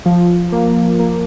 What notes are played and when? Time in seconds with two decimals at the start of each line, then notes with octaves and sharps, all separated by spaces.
0.06 F3
0.52 A#3
0.99 A#3